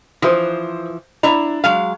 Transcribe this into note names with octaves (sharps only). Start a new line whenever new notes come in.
E3 F3 C5 D#6
D4 E4 A#5
F#3 G#3 F5